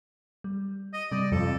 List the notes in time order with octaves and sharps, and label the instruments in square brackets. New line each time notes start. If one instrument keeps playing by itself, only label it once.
[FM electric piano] G3
[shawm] D#5
[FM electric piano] C3 G3 [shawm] D5
[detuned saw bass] F2 [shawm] A4